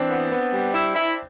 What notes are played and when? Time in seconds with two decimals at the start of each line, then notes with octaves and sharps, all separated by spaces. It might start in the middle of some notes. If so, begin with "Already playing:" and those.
Already playing: E3 C4 D4
0.10 B3
0.31 B3
0.52 G3
0.74 E4
0.95 E4